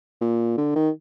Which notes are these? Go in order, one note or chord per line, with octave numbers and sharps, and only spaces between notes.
A#2
D3
D#3